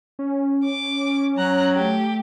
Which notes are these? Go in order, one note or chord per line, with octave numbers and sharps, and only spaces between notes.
C#4
D6
F#3 A#5 F#6
A3 G4